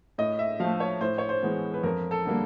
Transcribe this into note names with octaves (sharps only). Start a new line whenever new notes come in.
A2 D#5
E5
F3 A3 F5
C#5
A2 C5
C#5
C5
E3 G#3 B3
B4
F2 A#4
A4
D3 G3 A#3